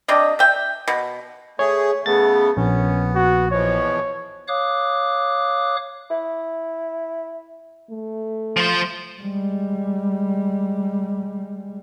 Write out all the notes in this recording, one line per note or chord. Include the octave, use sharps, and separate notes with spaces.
C3 D4 D#5
E5 G5
B2
A3 G#4 C#5
C#3 A3 B3 A6
A#1 B3 C#4
F#4
E2 B2 F3 C#5
C#5 F5 D6 D#6 F#6
E4
A3
F3 C5
G3 G#3